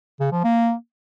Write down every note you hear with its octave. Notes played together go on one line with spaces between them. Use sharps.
C#3
F3
A#3